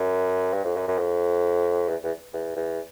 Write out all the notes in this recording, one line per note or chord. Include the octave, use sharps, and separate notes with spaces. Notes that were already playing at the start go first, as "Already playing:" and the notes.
Already playing: F#2
G2
F2
F#2
F#2
F2
E2
E2
E2
E2